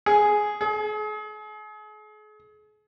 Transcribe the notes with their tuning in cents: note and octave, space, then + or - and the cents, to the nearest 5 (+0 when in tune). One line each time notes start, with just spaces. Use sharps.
G#4 +5
G#4 +40